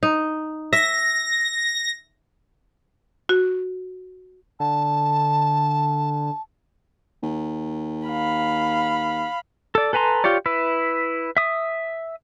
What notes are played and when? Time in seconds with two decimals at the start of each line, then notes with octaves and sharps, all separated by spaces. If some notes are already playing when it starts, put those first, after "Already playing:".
0.03 D#4
0.73 E5 A#6
3.29 F#4
4.60 D3 A5
7.23 D#2
8.07 F5 B5
9.75 A4 D5
9.93 A4 B4 G#5 A#5 C6
10.24 F4 G4 C#5 D5
10.46 E4 B4 E5
11.37 E5 D#6